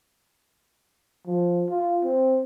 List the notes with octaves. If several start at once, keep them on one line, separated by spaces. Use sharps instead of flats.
F3
F4
C4